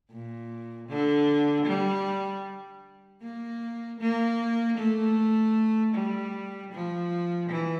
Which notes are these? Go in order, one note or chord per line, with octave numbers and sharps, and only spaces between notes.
A#2
D3
G3
A#3
A#3
A3
G3
F3
E3